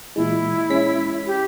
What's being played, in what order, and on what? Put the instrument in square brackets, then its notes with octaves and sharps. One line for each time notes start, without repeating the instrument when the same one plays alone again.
[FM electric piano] A#2 E3 G#3 [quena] E4
[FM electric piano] G#3 C#4 B6
[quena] G4